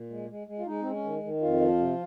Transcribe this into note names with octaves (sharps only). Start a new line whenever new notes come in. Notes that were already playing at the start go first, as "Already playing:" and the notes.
Already playing: A#2
G#3
G#3
G#3
F4
G#3 D#4
G#3 C4
C#4
D#3
D#3
F2 F4
F3
C3